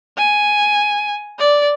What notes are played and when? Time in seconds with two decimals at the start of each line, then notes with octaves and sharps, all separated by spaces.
0.18 G#5
1.39 D5